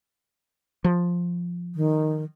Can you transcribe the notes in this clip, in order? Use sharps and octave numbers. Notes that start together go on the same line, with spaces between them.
F3
D#3